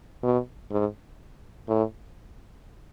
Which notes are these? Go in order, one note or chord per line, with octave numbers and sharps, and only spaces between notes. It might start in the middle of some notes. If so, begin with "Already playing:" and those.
B2
G#2
A2